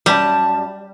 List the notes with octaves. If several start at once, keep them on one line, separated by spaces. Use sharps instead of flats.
F#2 G3 A5